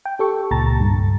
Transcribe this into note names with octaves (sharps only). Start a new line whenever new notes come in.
G5
G4 A4 C#6
C#2 A#2 A5 A#5 A6
G2